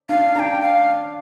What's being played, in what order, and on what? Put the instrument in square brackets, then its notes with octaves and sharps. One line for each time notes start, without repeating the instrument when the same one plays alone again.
[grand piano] D4 [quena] F5
[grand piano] D4 [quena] G5 A#5
[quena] F5